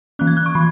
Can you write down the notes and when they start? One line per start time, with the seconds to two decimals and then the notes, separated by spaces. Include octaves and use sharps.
0.19 E3 A#3 C#4 F#6
0.27 G#6
0.37 F#6
0.46 C#6
0.55 E3 B5